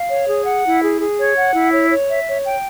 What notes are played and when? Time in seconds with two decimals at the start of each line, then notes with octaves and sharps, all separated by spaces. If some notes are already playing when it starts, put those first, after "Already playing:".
Already playing: F5
0.09 C#5
0.27 G#4
0.46 F#5
0.64 E4
0.82 G#4
1.00 G#4
1.18 C#5
1.36 F#5
1.54 E4
1.72 C#5
1.91 C#5
2.09 E5
2.27 C#5
2.44 G5